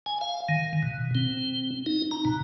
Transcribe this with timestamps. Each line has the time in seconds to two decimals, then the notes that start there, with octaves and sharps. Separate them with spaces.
0.06 G#5
0.21 F5
0.49 D#3
0.83 B2
1.15 C4
1.86 D#4
2.11 A#5
2.25 B2